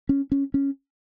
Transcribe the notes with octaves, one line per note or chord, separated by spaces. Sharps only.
C#4
C#4
C#4